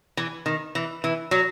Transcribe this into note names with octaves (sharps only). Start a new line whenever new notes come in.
E3
D#3
E3
E3
F#3